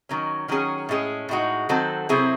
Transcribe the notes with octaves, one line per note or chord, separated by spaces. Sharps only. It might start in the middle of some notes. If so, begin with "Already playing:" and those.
D#3 F#3 C#4
D#3 F#3 C#4 G#4
A2 G#3 C#4 G#4
A2 G#3 D#4 F#4
D#3 F#3 C4 F#4 A4
C3 F#3 C4 E4 G#4